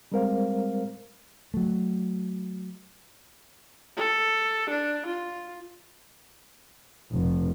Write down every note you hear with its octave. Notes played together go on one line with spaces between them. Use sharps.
G3 G#3 C4 A#4 C5 F5
F#3 A3
A4
D4
F4
F1